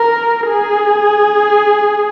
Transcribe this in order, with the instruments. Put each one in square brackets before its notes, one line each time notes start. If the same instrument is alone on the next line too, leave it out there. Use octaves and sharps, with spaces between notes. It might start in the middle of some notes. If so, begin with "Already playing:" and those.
Already playing: [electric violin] A#4
G#4